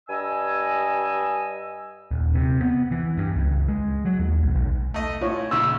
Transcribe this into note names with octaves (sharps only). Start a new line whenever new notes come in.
G2 D#5 G#5 E6
D#1
C3
B3
E3
G2
C#2
G#3
F#3
D#2
B1
B1
A3 D#5
A2 F4 C#5
A#1 C#3 E6